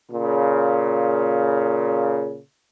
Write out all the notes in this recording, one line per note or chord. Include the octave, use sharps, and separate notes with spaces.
A#2 C#3